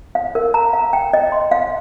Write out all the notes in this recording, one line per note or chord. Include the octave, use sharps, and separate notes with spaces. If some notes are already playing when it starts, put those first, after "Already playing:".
F5
A#4
A#5
F5
G5
D#5
C6
F5